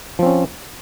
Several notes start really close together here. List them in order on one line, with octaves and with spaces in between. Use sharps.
F3 C4 C#4